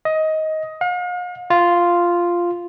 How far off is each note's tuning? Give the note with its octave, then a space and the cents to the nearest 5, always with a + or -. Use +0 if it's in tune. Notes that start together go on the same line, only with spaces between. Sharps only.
D#5 +15
F5 +45
F4 -5